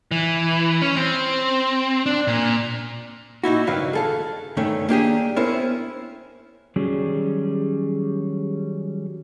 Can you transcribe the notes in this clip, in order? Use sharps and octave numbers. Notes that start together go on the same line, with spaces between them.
E3
C#4
C4
D4
A#2
A#2 D#4 E4 F#4
C#2 G2 D#3 F#3 B4 F5
G#4 A4 F5
G2 D#3 A3 C#4
A#3 D4 G4 G#4
B3 C#4 E4 A#4 C5
D#3 F#3 G3 C#4 G#4